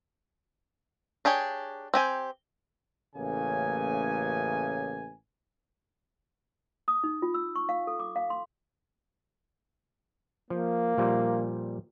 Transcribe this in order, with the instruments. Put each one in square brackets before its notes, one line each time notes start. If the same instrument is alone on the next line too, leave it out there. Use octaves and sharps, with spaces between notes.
[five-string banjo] D4 G4 G#4 C#5
C4 G4 G#5
[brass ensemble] A1 A2 C#3 A#3 G#5
[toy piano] D#6
D#4
F4
E6
C#6
F5
A4
D6
F5
C6
[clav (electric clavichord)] F3 [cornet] A#3
[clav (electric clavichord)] A#2 F3 G3